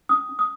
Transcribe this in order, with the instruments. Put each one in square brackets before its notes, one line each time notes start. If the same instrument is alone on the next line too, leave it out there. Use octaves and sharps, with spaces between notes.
[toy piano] C#4 D#6
C#4
D#6